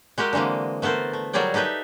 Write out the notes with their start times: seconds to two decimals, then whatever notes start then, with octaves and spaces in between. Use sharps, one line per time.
0.18 G#3 F#4 G4 A#4
0.33 D3 E3 G#3 A#3 C4
0.82 A3 B3 A4 A#4 C5
1.13 A3
1.33 F#3 G3 G#4 A#4 D5 G5
1.54 D#4 G4 A4 B4 E5